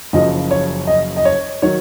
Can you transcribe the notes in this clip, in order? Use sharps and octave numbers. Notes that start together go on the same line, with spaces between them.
F#1 F#2 F3 D#5
C#5
D#5
D#5
C#5
D#3 F#3 C#5